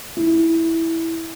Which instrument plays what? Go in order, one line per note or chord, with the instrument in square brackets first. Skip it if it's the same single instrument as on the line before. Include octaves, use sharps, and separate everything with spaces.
[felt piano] E4